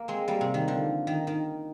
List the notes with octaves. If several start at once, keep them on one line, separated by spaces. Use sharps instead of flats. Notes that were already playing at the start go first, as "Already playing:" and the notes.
Already playing: A#3
G#3 C4
G3 A#3
C3
D#3
D3 F3
D#3
D#3